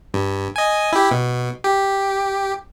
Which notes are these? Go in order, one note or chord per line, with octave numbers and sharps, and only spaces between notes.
G2
D#5 G#5
E4 G4
B2
G4